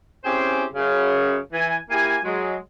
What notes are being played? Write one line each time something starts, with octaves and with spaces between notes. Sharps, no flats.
C4 C#4 E4 G4 G#4 C5
F#2 C#3
E3 G#5
A#3 E4 G4 G#5
F#3 G#3